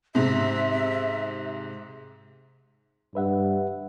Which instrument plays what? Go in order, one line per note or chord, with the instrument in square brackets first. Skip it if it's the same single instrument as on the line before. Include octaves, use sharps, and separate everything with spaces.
[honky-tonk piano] G#2 C3 [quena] E5
[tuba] G2 [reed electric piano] B4 E5 F#5